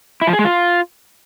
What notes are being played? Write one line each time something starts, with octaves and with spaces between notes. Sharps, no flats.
E4
F3
G#4
G#3
F4